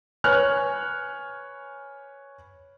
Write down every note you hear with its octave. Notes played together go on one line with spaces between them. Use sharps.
B4 C#5 G#5 F6 F#6